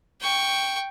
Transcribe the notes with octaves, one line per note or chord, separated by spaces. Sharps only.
G5 C#6